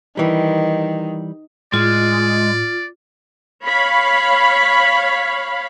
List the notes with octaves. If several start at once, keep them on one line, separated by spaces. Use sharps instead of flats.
D#3 E3 G3
A2 G#3 F4 D5
C#5 F5 B5